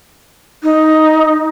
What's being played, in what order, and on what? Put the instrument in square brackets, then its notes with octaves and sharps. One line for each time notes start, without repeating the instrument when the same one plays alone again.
[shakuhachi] D#4